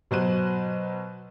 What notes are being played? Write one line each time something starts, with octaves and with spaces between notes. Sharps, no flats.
B2 F#3 C5 F#6 D#7